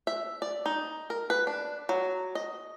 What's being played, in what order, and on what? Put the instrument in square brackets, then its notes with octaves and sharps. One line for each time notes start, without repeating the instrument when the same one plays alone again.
[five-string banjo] E5
D5
D#4
A#4
B4
D4
F#3
D#5